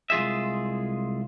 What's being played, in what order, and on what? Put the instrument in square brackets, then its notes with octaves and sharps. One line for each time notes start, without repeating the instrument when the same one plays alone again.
[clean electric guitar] C2 G#3 F4 G#4 E5